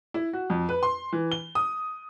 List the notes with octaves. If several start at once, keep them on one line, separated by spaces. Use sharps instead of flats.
E4
F#4
F2
B4
C6
E3
G7
D#6